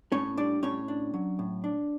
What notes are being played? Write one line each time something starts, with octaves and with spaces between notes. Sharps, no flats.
A2 C#4 C#5
G3 D4 D5
A2 C#4 C#5
D4
F#3
A2
D4